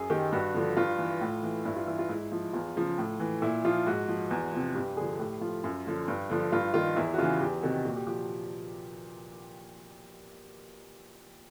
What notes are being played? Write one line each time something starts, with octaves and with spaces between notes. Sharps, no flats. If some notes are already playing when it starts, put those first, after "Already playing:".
Already playing: F#2 G#4
D#3 G4
G2 F#4
D3 F3
G2 F4
E3
A2
E3
G2 E4
F4
E3 E4
F4
G#2 E4
F3
E2 F4
C#3 F3
A2
E3
A#2 E4
F3 F4
G#2 F#4
F3
E2
C3 F3
G2 G4
D3 F3 G#4
A2 G4
F3 F4
F#2
D3 F3
G2
D3 F3
G2 F4
D#3 F4
E2 E4
F#4
C#3 E3 F4
E2 G4
C3 D#3 F#4
A#2 F#4
G4
F3 G4